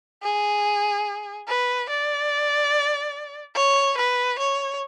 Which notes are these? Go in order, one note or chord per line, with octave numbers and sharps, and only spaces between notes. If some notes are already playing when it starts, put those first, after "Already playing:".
G#4
B4
D5
C#5
B4
C#5